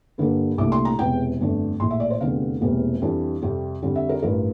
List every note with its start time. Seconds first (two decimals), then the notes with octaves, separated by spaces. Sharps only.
0.18 G2 D3 G3 A#3 D4
0.58 C2 A#2 A3 D4 D6
0.72 C6
0.85 A#5
0.99 E1 E2 C3 G5
1.39 G1 F2 D3 A3 D4
1.80 A#1 A2 F3 C6
1.91 E5
2.00 D5
2.10 C5
2.21 F1 E2 D3 G3 C4 F5
2.61 E1 E2 C3 G3 A#3
3.02 F2 E3 G3 D4
3.42 F2 C3 G3 C4
3.82 F2 D3 G3 C4
3.96 E5
4.09 A#4
4.23 A1 G2 F3 A#4